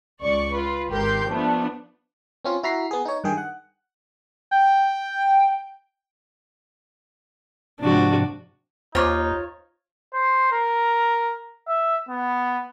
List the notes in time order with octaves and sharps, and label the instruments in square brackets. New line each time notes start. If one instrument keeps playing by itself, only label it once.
[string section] C#2 D5 C#6
F4 B4
G#1 G4 A#4 C6 G6
F3 A3 B3 D4
[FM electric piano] C4 C#4 F4
E4 F#4 A#5 B6 C7
B3 G#4
D#4 C#5
G2 D#3 G#4 G5
F#5
[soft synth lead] G5
[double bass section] G#2 C3 F3 [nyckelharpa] D4 F#4
[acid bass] D#2 [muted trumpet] D#4 [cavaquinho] F4 C#5 [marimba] C5 D6
[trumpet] C5
A#4
E5
B3